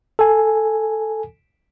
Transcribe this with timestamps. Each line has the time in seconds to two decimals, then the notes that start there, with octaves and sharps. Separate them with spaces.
0.19 A4 G#5